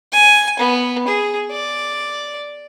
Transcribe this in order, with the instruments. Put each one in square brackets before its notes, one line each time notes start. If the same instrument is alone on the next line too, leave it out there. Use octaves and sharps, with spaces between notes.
[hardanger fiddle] G#5
B3
G#4
D5